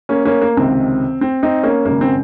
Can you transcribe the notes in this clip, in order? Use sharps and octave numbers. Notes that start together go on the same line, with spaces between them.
A#3 C#4
A#3 C#4
A#3
C#2 C3 D#3 C4
C4
C4 D#4
A#3 C#4
G#1 F#2 C#3 A#3
C4